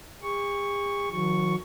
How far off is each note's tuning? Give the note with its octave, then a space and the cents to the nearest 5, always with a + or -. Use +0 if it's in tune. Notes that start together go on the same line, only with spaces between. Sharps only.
G#4 -45 C#6 +0
D#3 +15 F#3 -35 C#6 +0